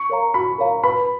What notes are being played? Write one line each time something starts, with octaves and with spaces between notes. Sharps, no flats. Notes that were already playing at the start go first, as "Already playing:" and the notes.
Already playing: C#6
A#4 C#5 F5 A#5
F#4 B5
A#4 C#5 F5 A#5
B4 B5